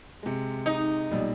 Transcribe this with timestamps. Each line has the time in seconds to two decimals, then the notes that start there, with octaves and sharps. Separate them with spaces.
0.23 C3 G#3
0.66 D#4
1.11 B1 A#2 G3